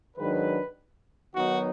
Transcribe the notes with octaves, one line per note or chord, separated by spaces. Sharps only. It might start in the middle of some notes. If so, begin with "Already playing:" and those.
G#2 D#3 F#3 D4 B4
D#3 F#3 B3 D#4 F#4